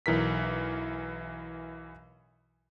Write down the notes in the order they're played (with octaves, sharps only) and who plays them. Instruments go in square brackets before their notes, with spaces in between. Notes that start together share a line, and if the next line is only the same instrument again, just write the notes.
[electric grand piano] B1 E3 A#4 B6